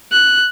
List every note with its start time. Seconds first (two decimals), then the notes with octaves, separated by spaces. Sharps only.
0.12 F#6